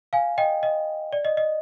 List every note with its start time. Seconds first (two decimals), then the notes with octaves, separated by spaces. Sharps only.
0.13 F5 G#5
0.38 D#5 G5
0.63 D#5
1.13 D5
1.25 D#5
1.37 D#5